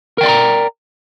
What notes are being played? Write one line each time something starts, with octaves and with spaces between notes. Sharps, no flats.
A#4 D5 G5 A#5 C6